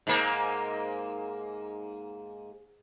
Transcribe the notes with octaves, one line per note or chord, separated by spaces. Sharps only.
G#2 A#3